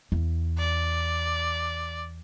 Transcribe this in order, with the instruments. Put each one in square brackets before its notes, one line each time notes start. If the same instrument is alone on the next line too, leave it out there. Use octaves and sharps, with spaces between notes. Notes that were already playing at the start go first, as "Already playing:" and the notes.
[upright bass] E2
[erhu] D5